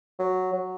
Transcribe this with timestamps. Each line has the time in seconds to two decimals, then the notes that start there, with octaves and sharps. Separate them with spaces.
0.19 F#3
0.53 F#3